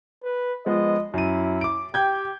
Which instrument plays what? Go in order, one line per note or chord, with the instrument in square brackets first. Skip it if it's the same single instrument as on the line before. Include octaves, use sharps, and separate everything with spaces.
[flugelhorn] B4
[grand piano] F3 G#3 B3 [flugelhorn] D#5
[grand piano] F#2 D#7 [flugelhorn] E4
[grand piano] D6 D7
[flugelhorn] G4 [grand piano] G5 G6 G#6